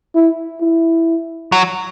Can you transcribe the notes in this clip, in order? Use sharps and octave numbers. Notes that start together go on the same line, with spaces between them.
E4
E4
F#3